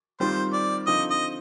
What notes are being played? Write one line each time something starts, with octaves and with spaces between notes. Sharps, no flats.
D#3 G3 C4 F4 C5
D5
D3 F3 C4 D#4 D#5
D#5